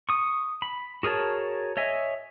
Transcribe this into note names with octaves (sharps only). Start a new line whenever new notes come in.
C#6 D#6
B5
F#4 G#4 A#4 C#5 A5
C#5 D#5 E5 G#5